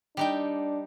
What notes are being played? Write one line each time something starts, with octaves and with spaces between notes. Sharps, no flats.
G3 D4 D#4 G5